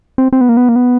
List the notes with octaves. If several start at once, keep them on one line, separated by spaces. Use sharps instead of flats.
C4
C4
B3
A#3
B3
A#3
B3